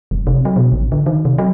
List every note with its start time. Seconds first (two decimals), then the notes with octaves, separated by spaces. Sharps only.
0.11 F#1
0.27 C3
0.45 F#3
0.56 B2
0.72 A1
0.92 D3
1.06 D#3
1.25 C3
1.38 F#3